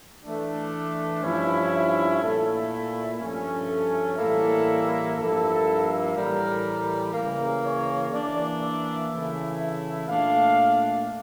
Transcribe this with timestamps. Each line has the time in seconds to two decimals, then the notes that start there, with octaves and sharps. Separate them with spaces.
0.24 E3 A3 D4
1.22 G2 F3 C#4 E4
2.21 A#2 A3 E4 A4
3.19 G2 F3 A3 C#4
3.69 A4
4.18 A2 E3 G3 A#3 E4 A4
5.16 G2 F3 A#3 E4 A4
6.15 A2 E3 G3 A#4
7.13 C#3 E3 A#3 A#4
7.62 C#5
8.12 E3 A#3 D4 D5
8.61 E5
9.10 C#3 E3 A3 E4
10.08 A#2 A3 D4 F5